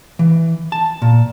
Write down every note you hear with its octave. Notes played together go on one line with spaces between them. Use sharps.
E3
A5
A#2